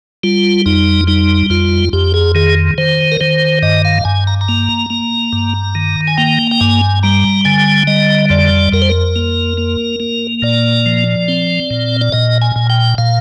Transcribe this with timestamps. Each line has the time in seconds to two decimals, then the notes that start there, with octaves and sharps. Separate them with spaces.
0.23 G3 F4
0.66 F2 D#4
1.07 G3 D#4
1.50 F2 F4
1.93 F2 G4
2.14 G#4
2.35 D#3 G#4
2.78 D#3 C5
3.12 A#4
3.21 D#3 C5
3.62 G2 D#5
3.85 F5
4.05 G2 G#5
4.27 A#5
4.41 A#5
4.49 A#3
4.90 A#3
5.33 G2
5.75 D#3
6.07 G#5
6.18 A#3 G5
6.51 G5
6.61 G2 G#5
7.03 G3 A#5
7.45 D3 G#5
7.87 G3 D#5
8.30 F2 D5
8.72 F2 A#4
8.82 C5
8.89 A#4
9.16 A#3
9.57 A#3
10.00 A#3
10.42 A#2 D5
10.86 F3
11.28 C4
11.71 A#2
12.01 D5
12.12 A#2 D#5
12.42 G#5
12.56 A#2
12.70 G5
12.98 A#2 F5